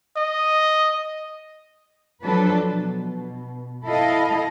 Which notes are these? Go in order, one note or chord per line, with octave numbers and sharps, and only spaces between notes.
D#5
F3 F#3 D4 A4 B4
B2
E4 A4 D#5 F5